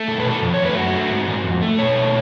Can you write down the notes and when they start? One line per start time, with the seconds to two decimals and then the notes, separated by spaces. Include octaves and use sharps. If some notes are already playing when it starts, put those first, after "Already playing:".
Already playing: A3
0.08 B2 A4
0.20 B4
0.25 B2
0.31 A4
0.43 F2
0.54 C#5
0.59 A3
0.65 B4
0.77 F#2 F#4
0.94 A3
1.10 G#2
1.28 G#2
1.44 F2
1.62 A3
1.79 B2 C#5
1.96 A3